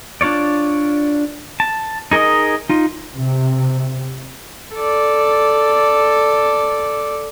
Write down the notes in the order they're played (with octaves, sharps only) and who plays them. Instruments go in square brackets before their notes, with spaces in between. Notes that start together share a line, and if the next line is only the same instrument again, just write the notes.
[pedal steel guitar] D4 F4 C#5 D5
A5
D#4 G#4 A#4 D#5 D#6
D#4 F4
[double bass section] C3
[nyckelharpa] A4 D5